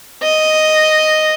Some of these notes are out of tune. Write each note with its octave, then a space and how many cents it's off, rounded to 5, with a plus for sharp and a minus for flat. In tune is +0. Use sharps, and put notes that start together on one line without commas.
D#5 +0